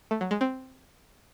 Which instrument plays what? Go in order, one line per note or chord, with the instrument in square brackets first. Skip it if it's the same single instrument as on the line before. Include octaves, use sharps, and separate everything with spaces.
[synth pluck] A3
F#3
G#3
C4